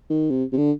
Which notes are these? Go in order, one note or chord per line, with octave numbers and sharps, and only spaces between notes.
D#3
C3
C3
D3